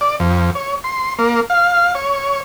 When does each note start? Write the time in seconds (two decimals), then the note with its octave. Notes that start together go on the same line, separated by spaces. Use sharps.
0.01 D5
0.20 F2
0.55 C#5
0.84 C6
1.19 A#3
1.50 F5
1.95 C#5